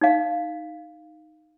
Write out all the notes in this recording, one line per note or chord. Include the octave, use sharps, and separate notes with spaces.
D#4 F5